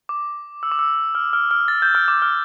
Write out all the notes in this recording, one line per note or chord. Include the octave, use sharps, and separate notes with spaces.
D6
E6
D6
E6
F6
F6
F6
A6
G6
F6
D6
F6